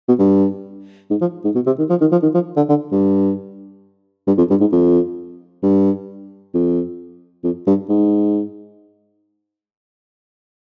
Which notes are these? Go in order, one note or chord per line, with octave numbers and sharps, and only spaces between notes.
B2
G2
G#2
F3
G#2
B2
C3
D#3
F3
D#3
F3
D#3
F3
D3
D3
G2
G2
F2
G2
G#2
F2
G2
F2
F2
G2
G#2